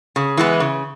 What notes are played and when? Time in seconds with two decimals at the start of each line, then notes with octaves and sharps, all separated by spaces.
0.16 C#3
0.37 E3 G#3 B3
0.60 C#3